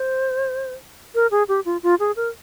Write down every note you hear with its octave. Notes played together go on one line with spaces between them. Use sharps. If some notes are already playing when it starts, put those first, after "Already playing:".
Already playing: C5
A#4
G#4
G4
F4
F4
G#4
A#4